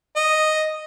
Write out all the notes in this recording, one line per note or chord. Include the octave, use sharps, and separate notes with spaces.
D#5